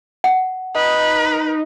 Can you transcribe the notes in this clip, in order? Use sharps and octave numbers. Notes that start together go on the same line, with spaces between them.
F#5
D#4 B4